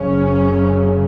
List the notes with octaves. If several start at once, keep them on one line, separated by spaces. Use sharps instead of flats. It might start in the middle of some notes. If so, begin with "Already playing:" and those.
Already playing: F#1 F#2 C#3 C#4